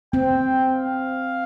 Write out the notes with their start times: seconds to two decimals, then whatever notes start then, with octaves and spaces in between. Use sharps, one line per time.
0.13 C4 G5
0.74 F5